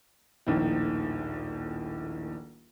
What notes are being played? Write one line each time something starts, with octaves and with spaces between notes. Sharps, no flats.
D#1 A#1 A2 D#3